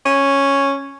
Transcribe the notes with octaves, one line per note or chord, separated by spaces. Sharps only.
C#4